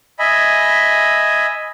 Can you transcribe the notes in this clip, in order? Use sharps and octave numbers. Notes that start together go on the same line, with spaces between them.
D#5 E5 G#5 B5